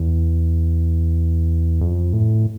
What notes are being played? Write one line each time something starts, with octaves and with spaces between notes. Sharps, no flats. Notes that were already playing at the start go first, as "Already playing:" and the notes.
Already playing: E2
F2
A2